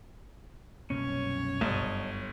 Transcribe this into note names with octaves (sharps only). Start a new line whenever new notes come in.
C2 F#2 B2 A#3 C#4 C#5
G1 D#5 A5